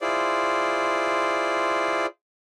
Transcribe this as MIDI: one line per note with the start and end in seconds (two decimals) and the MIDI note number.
0.01 2.06 64
0.01 2.06 65
0.01 2.06 68
0.01 2.06 72
0.01 2.06 74